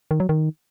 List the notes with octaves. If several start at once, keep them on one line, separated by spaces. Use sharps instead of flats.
D#3
F#3
D#3